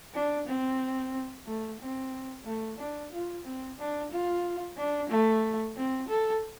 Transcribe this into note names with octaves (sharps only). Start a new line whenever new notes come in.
D4
C4
A3
C4
A3
D4
F4
C4
D4
F4
D4
A3
C4
A4